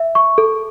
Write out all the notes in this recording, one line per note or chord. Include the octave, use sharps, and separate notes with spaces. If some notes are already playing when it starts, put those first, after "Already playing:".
Already playing: E5
C#6
A4